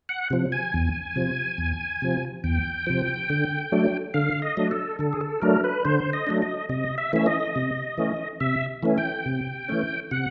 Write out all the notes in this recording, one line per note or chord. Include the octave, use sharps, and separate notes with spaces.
F#5
C3 F3
G#5
E2
C3 F3
E2
C3 F3
E2 G5
C3 F3
D3
F#3 A3 D4
D3 F5
D#5
F#3 A3 D4
A4
D3 A4
G#4
A4
F#3 A3 D4 A#4
B4
D3 C5
D#5
F#3 A3 D4
D#5
C3 D#5
E5
E3 A3 C#4 E5
D#5
C3
E3 A3 C#4
C3 E5
E3 A3 C#4
G5
C3
E3 A3 C#4
C3 F#5